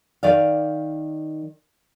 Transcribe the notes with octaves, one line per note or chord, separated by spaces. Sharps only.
D#3 D5 F5